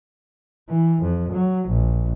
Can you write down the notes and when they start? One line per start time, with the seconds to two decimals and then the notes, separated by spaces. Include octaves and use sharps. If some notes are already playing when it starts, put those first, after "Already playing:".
0.70 E3
1.03 F2
1.33 F#3
1.68 A#1